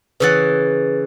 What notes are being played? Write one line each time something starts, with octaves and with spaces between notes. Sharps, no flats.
C#3 E3 B4 C#5 F#5 A6